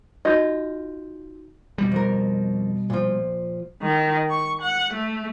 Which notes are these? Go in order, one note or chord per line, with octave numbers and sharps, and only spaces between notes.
D#4 F4 F#4 D#5 G6
B2 G3
F2 A#4
A#2 F3
D#3
C#6
F#5
A3